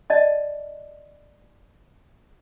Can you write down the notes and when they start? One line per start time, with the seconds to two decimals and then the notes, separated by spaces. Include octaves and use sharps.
0.10 D5 D#5 A5